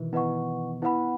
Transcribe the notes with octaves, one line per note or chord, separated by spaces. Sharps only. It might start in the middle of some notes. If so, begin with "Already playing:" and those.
Already playing: B2 D#3 E3
B3 E4 B4 D#5 F#5 C#6
B3 E4 B4 F#5 B5